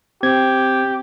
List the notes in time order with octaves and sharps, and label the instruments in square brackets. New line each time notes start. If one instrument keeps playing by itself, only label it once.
[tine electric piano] C4 G#6 [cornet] G4